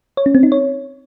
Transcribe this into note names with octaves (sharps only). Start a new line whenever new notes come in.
C#5
C#4
C4
D#4
C#5